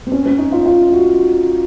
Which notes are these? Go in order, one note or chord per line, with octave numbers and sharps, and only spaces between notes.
C4
C#4
C#4
D#4
F4
F4
F#4